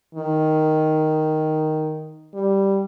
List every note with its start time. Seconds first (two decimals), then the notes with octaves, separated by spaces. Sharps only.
0.15 D#3
2.34 G3